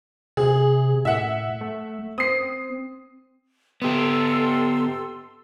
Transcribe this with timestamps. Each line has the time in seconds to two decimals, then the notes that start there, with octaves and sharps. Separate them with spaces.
0.37 C3 G#4
1.05 A2 E5 F#5
1.61 A3
2.18 C4 D#6 C7
3.82 B3 G4 A4 C6 E6